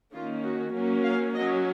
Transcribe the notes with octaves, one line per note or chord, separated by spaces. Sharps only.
D#3 A#3 C#4 F4
F#4
F#3 A#3 C#4
F5
F#3 C#4 D#5